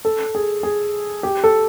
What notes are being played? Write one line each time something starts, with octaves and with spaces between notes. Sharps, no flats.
A4
G#4
G#4
G4
A4